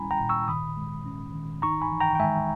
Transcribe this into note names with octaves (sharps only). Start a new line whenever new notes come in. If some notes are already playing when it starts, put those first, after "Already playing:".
Already playing: G3 C#4 E4 G#5 A#5 B5
G5 A#5
A#2
C#6 E6
D#3 B5 D#6
G#3
C#4
D#3
D#4 A#5 C#6
G#5 B5
E3
G5 A#5
G5
G#3 E5 G#5